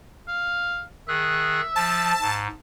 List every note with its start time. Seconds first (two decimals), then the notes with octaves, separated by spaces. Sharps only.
0.28 F5
1.08 D#3 G#4 E5 F#6
1.76 F3 A5
2.21 G#2